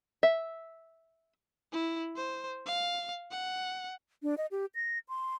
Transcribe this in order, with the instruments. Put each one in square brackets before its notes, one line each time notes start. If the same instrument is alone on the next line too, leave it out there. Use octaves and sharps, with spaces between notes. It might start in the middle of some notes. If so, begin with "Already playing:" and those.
[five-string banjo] E5
[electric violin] E4
C5
F5
F#5
[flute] D4
D#5
G4
A#6
C6